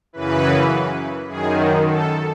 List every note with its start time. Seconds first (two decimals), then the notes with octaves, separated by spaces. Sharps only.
0.13 F#2 C#3 E3 B4
1.28 F#2 D#3 G#4
1.86 A4